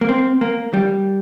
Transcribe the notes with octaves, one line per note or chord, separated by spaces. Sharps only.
A#3
C4
A#3
G3